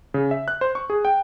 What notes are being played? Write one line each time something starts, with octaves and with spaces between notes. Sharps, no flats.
C#3
E5
F#6
C5
C#6
G#4
G5